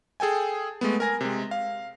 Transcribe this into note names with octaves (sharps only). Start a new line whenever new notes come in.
G#4 A4 G5 G#5
G#3 A3 B3
A#4 G#5 A#6
C3 G#3
F5